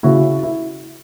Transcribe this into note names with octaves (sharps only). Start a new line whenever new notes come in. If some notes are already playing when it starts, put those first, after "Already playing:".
C#3 E4 F#4
E4